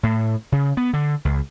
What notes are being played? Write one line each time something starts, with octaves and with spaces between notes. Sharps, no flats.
A2
C#3
B3
D3
C#2